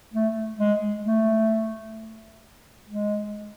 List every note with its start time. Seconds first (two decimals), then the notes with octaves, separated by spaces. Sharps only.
0.14 A3
0.59 G#3
1.06 A3
2.89 G#3